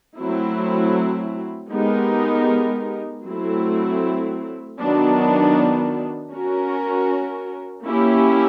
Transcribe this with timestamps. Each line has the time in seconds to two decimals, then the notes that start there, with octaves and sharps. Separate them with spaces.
0.17 F#3 A3 C4 E4
1.71 G#3 B3 D#4 G4 A#4
3.24 F#3 A3 C4 E4
4.78 D#3 F#3 B3 D4
6.31 C#4 F#4 A#4
7.85 A#3 C#4 E4 G4